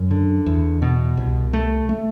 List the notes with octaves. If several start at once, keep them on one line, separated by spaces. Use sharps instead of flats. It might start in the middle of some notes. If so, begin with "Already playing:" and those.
Already playing: F#2
D3
E2
B2
C2
A3
A3